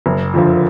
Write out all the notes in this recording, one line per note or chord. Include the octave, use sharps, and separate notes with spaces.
F#1
F2 D3 F3